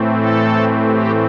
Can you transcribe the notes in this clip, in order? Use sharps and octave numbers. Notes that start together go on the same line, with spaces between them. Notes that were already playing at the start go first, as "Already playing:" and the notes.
Already playing: A2 E3 A3 C4
A4
G4